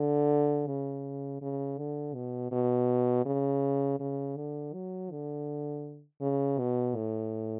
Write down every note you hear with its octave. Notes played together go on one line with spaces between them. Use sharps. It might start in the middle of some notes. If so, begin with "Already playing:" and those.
Already playing: D3
C#3
C#3
D3
B2
B2
C#3
C#3
D3
F#3
D3
C#3
B2
A2